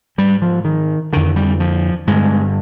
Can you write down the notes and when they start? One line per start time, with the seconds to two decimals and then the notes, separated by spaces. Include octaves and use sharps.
0.18 G#2 G3
0.42 F3
0.65 D#3
1.13 F2 D3 D#3
1.36 G3
1.60 F3
2.07 G2 D3 G#3